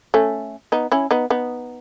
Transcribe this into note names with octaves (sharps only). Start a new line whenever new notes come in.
A3 C#4
B3 D#4
C#4 E4
B3 D#4
B3 D#4